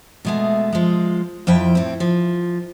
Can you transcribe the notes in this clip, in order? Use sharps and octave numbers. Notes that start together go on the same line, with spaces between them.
B2 G#3 A3
F3 G#3
F2 F3 E4 G5
A2 C4
F3